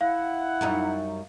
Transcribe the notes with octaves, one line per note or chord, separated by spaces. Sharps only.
E4 F5 F#5
F#2 G3 D#4